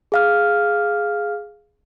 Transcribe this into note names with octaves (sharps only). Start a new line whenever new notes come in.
G#4 F5 F6